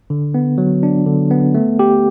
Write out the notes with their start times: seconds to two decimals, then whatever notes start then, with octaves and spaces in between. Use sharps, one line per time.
0.10 D3
0.34 B3
0.58 F#3
0.83 D4
1.06 D3
1.31 B3
1.55 A3
1.79 G4